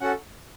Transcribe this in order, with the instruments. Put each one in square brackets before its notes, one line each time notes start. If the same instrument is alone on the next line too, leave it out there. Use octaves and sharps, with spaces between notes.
[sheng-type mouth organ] C#4 F#4 A4 F#5